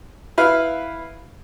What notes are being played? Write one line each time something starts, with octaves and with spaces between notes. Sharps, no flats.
E4 B4 F5 F6